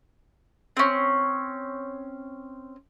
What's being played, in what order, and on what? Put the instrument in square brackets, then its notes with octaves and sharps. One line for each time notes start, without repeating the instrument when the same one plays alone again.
[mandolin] C4 C#4